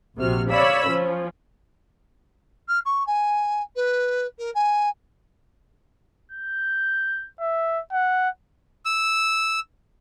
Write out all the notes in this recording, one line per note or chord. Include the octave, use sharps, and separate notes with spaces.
A#1 C3 F#4 F6
C#5 D5 F5 B5 E6
F3 C#4
F6
C#6
G#5
B4
A#4
G#5
G6
E5
F#5
E6